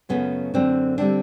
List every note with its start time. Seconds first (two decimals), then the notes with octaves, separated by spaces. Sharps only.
0.09 F#2 C#3 F#3 A3 B3 C#4
0.54 F#2 D3 F#3 A3 C4 D4
0.98 D3 G3 C4 D4